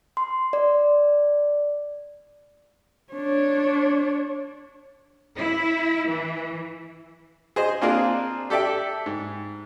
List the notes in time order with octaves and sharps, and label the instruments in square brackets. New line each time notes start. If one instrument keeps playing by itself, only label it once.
[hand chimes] C6
D5
[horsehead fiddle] D4 C#5
[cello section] E4
E3
[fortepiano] G#4 C5 D#5
A#3 C4 D4 F4 G#4 A#4
G4 A4 D5 E5 G5
G#2